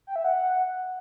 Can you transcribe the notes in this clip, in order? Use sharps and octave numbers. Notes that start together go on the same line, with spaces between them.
G5
E5
F#5